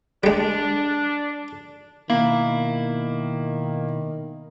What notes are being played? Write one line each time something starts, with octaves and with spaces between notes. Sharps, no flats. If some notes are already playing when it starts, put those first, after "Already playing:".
G3 G#3 D4
B2 D#3 A#3 E4